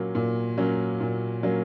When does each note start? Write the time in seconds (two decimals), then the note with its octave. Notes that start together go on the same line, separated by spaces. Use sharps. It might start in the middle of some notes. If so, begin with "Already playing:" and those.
Already playing: A#2 F#3 A#3 C#4
0.15 A#2
0.57 F#3 A#3 C#4
1.00 A#2
1.43 F#3 A#3 C#4